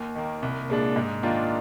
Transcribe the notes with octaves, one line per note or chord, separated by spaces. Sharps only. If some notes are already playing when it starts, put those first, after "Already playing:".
Already playing: D#2
D#3 A#3
C2
A#2 G#3 D4
G#2
D#3 A#3 D4 F4